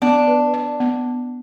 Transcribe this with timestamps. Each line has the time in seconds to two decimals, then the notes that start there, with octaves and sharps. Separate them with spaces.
0.02 B3 D4
0.27 B4
0.54 D5
0.80 B3